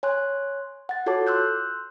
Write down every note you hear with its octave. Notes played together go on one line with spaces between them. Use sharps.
C#5 G#5 C6 F#6
F#5 A6
F4 F#4 A4 C#5 A5 D6
C6 E6 F#6 G6